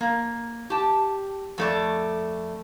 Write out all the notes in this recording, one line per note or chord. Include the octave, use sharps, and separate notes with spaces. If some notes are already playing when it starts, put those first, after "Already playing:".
A#3
G4 A5
F2 A3 D5